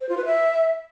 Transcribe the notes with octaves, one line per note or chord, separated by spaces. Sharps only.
C5
F4
B4
E5